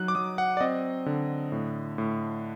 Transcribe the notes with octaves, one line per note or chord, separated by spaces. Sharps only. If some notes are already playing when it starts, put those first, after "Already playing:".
Already playing: F#3 D#4 F#6
D6
F#3 D#6
F#5
D5
C4 D#5
D3
A2
A2